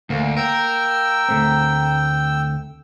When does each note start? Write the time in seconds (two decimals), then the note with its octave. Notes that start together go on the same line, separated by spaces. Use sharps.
0.10 D2 A#3
0.37 A#4 G5 E6
1.29 D2 A3 C4